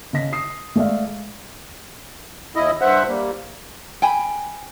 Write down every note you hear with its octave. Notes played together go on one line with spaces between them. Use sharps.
C#3 D#5 A#6 B6
D#6 C7
G#3 A3 D5 E5 F5
D#2 E4 D#5
G2 C5 E5 F#5
G3 A#3
G5 G#5 B5